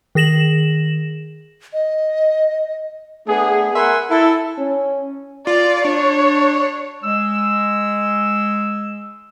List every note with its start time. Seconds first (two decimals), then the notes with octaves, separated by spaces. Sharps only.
0.15 D#3 G#4 A#6 E7 F#7
1.73 D#5
3.27 A3 B3 D4 G#4
3.74 A#4 E5 F#5 G#5 B5 C6
4.09 E4 A4
4.58 C#4
5.47 F4 D5
5.84 D4 C#5
7.04 G#3 E6